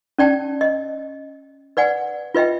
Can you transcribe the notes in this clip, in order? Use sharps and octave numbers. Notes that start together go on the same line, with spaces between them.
C#4 D5 G5 A5
D#5
B4 D5 F#5 G#5
F4 B4 D#5 E5 G5